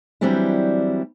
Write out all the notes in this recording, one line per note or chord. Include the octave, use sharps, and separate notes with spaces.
E3 F#3 G3 C4 D4 E4